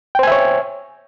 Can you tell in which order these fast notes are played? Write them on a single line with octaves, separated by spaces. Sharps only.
G5 C5 G#5 E5 C#5